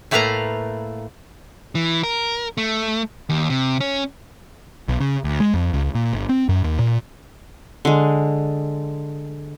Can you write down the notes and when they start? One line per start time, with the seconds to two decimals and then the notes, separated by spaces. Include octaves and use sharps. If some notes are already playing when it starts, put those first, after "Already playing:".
0.11 A2 A3 A#3 B4 F5 A#5
1.75 E3
2.03 A#4
2.58 A3
3.29 D#2
3.50 C3
3.80 C#4
4.88 B1
5.00 C#3
5.24 D2
5.40 G#3
5.54 F2
5.73 C#2
5.95 A#2
6.13 G1
6.29 C4
6.49 F#2
6.64 D#2
6.79 A#2
7.85 D3 G#3